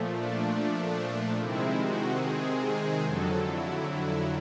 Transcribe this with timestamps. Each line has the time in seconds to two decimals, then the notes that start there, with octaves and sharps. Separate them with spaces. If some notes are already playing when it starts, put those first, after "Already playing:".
Already playing: A#2 F3 A3
0.13 D4
1.39 C3 D#3 G#3 C4 E4
1.80 F#4
2.22 G#4
2.64 G#4
3.06 F2 D3 F#3 A4
3.47 E4
3.89 E4